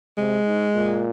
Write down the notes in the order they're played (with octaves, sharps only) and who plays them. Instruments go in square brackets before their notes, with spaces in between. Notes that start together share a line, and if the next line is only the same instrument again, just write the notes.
[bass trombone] C3 [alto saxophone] G#3
[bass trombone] G#2
A#2